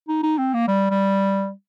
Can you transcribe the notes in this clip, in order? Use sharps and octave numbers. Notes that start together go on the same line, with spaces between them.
D#4
D#4
C4
A#3
G3
G3